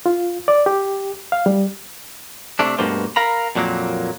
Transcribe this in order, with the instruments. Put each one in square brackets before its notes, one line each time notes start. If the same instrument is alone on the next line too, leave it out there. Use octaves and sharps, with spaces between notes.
[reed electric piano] F4
D5
G4
F5
G3
[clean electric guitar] C3 A3 D4
G2 B2 A3 A#3 C5
A#4 F5 A#5 B5
F2 A#2 F#3 G#3 A#3